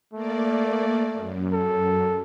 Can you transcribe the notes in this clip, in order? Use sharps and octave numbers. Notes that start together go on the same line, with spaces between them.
A3 A#3 D5
F#2
A4